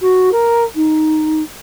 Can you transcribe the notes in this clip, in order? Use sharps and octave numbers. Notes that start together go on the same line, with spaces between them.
F#4
A#4
D#4